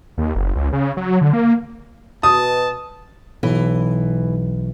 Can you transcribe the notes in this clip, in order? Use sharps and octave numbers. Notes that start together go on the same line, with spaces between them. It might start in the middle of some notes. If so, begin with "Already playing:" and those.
D#2
F#1
C#2
C#3
F#3
D3
A#3
B2 A5 D#6
B1 E3